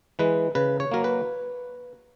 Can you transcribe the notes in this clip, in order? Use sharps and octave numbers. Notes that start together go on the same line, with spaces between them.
E3 G#3 B4
C#3 B4
C#5
F#3 A#3 A#4
B4